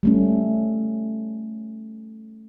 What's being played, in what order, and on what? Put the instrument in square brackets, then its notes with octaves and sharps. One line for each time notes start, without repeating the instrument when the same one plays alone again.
[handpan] G3 A3 C#4